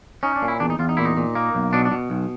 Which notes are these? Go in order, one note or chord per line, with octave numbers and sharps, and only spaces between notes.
C#4 D#4
D4
A#2
E4
E2 D4
D#4
E2 F4
D#4
A#2 E4
D#4
A#2
A#3
B1
B2 D4
D4
B2
B1